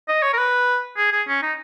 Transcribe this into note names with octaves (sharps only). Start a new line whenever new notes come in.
D#5
C#5
A#4
B4
G#4
G#4
C#4
D#4